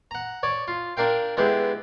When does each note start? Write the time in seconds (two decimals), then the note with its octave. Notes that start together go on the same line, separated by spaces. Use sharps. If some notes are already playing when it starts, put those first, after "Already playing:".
0.11 F#5 A#5
0.43 C#5 D5
0.68 F4
0.97 D4 A#4 F5 G5
1.37 D3 G#3 B3 E4 G4